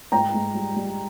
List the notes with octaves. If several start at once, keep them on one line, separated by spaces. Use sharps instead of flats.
G#2 G5 A#5
G#2
G3
G3